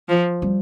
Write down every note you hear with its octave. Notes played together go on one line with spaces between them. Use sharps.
F3
G3